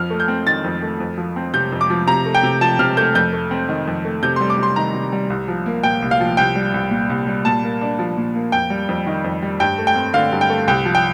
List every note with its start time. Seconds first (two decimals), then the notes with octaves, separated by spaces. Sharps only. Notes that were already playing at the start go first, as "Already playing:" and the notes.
Already playing: F2 F3 F6
0.10 A3
0.20 G6
0.28 C4
0.46 D#3 A6
0.64 F2
0.82 A3
1.00 F2
1.17 F3
1.36 C4
1.54 C3 G6
1.72 F2
1.81 D6
1.90 F3
2.07 C3 A#5
2.26 A3
2.35 G5
2.43 C3
2.61 F3 A5
2.79 C3 F6
2.97 A3 G6
3.15 F2 G6
3.33 A3
3.51 C4
3.69 D#3
3.87 F2
4.05 A3
4.23 C3 G6
4.36 C6
4.41 G3
4.50 D6
4.58 C3 C6
4.76 D#3 A#5
4.94 C3
5.12 G3
5.30 C2
5.48 F3
5.66 A#3
5.83 A#2 G5
6.02 C2
6.11 F5
6.20 F3
6.37 C2 G5
6.55 G3
6.74 C2
6.91 A#2
7.10 C2
7.27 G3
7.45 A#2 A5
7.63 A#3
7.81 D4
7.99 F3
8.17 A#2
8.35 A#3
8.52 F2 G5
8.70 G3
8.89 F2
9.07 D#3
9.24 F2
9.42 G3
9.60 G2 G5
9.78 A3
9.87 G5
9.96 C4
10.14 D3 F5
10.32 G2
10.41 G5
10.50 A3
10.68 C2 G5
10.85 F3
10.95 G5